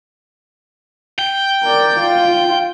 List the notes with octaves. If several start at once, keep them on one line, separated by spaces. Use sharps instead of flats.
G5
A#4 D5
F4